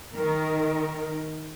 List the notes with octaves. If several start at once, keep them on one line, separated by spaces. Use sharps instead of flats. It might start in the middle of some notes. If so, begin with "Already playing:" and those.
D#3 A#4